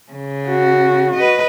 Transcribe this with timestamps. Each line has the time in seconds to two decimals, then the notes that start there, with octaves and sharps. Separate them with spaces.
0.12 C#3
0.49 F#4
1.16 B4 D#5